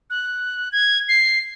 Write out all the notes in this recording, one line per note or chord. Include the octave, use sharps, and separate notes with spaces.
F#6
G#6
C7